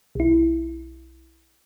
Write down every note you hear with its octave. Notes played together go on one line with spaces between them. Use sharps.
B1 E4